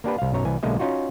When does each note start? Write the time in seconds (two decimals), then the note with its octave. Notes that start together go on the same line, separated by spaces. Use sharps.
0.04 A#3 D4 G4 B4
0.18 C2 F5
0.33 B1 F#2 C#5 A#5
0.45 C2 E3 G#5
0.63 B1 D3 G#3 A#3 D#5 E5
0.79 C#4 D#4 F4 F#4